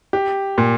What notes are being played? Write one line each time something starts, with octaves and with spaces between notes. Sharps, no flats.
G4
A#2